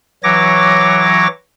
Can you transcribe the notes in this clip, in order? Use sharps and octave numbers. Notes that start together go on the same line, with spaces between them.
E3 F#3 C#5 D6 A#6